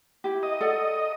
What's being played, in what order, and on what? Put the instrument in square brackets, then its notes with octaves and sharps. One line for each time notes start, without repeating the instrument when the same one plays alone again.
[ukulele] E4 G4
[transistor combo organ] D#5
[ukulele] A4 D5 F#5